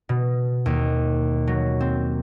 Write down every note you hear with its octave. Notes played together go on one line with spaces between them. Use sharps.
B2
D#2
F#3
C4